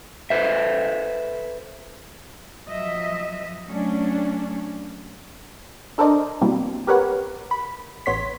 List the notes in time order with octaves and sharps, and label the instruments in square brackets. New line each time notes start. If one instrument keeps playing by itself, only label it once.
[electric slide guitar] A4 B4 C5 E5
[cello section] F3 F#3 D#5 E5
F#3 A3 C#4 D4
[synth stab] D4 A4 A#4 C5 D5 D#5
B2 E3 F#3 G3 A#3 C4
G4 A#4 B4 C#5 F#5
B5
A1 B3 C#5 C6 B6